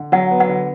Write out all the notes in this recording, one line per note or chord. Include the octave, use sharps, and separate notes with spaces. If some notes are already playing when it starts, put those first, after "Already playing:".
Already playing: D3
F#3 F#5
B3
F#5
D3